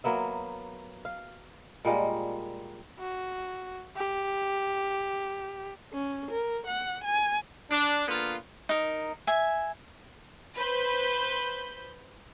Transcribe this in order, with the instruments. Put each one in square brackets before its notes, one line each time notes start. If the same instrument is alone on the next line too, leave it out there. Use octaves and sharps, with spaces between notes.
[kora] F#3 A#3 B3 E5
F5
A#2 G3 G#3 A#3
[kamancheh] F#4
G4
[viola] C#4
A#4
F#5
G#5
[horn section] D4
D3 A#3 B3 F4
[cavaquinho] D#4 A#4
E5 G#5
[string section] B4 C5 B5 G6